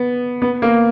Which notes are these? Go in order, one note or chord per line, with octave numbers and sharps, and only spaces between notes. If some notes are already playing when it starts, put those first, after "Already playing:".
Already playing: B3
B3
A#3